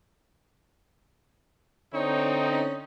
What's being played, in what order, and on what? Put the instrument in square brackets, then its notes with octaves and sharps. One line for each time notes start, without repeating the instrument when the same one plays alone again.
[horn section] D3 C4 D#4 [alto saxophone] C#5
[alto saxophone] C#4